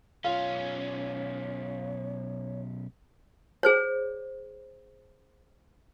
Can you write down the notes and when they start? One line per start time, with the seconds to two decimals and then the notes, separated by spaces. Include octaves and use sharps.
0.24 B1 C#4 F4 C#5
3.63 G#4 C5 C#5